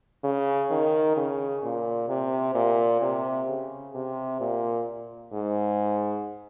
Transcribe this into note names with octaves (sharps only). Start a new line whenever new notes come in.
C#3
D#3
C#3
A#2
C3
A#2
C3
C#3
C3
A#2
G#2